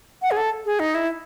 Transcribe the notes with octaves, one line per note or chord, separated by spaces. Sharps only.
F#5
G#4
A4
G#4
D#4
E4